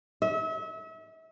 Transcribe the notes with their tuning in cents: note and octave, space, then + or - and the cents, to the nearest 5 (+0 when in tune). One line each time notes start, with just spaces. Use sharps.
E5 -35